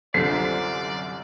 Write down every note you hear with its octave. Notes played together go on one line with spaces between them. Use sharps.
C2 F#2 D3 F3 D5 C7